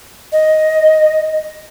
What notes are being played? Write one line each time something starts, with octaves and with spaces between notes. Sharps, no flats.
D#5